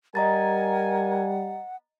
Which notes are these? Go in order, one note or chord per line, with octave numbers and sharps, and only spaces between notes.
G3 A#4 D#5 F#5 G#5 A#5 A6